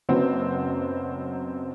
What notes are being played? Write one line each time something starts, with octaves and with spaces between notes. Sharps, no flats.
F#1 F#2 F#3 B3 C4 B4